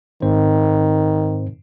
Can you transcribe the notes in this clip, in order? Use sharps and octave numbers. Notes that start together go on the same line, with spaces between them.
G#2 D#3 C4 C5